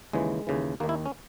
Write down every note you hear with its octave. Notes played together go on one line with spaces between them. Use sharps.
D#2 C#3 E3 G#3
D#2 C#3 E3
D#2 D#3 A#3
E4
C#4